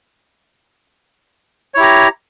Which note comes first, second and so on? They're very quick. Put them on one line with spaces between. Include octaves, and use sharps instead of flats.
C#5 E4 G4 A#5